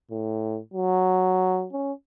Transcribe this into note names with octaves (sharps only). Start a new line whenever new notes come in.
A2
F#3
C#4